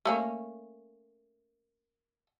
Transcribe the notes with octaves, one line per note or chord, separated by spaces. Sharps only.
A3 A#3 C#4